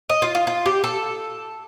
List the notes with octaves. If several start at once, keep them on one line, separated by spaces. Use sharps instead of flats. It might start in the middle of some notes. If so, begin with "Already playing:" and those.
D#5
F4
F4
F4
G4
A4